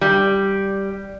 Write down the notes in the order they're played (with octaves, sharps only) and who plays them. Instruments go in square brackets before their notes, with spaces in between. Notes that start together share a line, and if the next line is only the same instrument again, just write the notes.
[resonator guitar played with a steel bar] G3